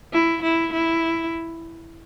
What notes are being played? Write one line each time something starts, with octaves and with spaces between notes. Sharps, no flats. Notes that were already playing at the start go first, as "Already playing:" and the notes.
E4
E4
E4